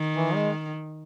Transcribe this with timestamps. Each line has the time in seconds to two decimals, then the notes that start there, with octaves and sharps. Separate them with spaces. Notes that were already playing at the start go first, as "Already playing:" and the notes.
Already playing: D#3
0.13 E3
0.35 G#3